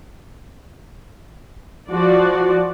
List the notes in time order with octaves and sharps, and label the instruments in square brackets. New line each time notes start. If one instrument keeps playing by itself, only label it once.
[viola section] F3 F#4 D5